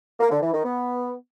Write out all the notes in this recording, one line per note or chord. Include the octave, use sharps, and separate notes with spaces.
A#3
D3
E3
D#3
B3